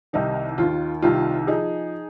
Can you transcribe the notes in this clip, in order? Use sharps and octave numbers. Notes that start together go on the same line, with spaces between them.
C2 C3 D#3 D#4
D#2 D#3 F4
C2 C3 D#3 F4
F3 D#4 G#4